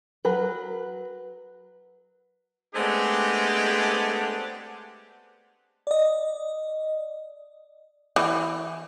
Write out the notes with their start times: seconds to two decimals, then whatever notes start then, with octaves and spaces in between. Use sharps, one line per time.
0.25 F#3 A#4 B4
2.75 G#3 A3 B3 C4 D4 G4
5.87 D5 D#5
8.16 E3